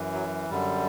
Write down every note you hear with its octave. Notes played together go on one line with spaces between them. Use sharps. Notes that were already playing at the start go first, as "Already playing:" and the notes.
Already playing: F#2 E3
F#3
F#2 D3 G3